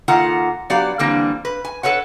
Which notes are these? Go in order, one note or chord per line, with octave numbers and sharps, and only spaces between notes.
D#3 A#3 F4 A4 F#5 A#5
F#3 B3 G4 D5 F5
D3 E3 G3 A#3 C4
B4
G#5
A4 B4 C#5 F#5